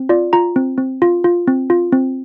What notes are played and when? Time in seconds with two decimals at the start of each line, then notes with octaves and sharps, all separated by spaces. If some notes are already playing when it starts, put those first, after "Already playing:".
Already playing: C4
0.09 F4 D5
0.33 F4 A#5
0.56 C4
0.78 C4
1.02 F4
1.24 F4
1.48 C4
1.70 F4
1.92 C4